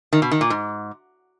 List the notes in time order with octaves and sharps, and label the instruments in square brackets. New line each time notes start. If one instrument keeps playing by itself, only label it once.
[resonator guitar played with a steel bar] D#3
B2
D#3
A#2
G#2